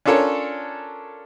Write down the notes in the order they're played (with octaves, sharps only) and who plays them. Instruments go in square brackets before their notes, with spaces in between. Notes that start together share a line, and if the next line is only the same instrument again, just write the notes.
[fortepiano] C#4 D4 F4 A4 A#4 C#5